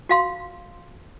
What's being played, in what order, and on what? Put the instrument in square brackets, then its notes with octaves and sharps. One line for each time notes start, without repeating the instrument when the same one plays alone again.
[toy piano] F#4 F5 C6